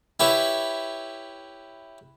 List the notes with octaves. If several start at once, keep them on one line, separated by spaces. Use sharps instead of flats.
E4 G4 B4 C#5 E5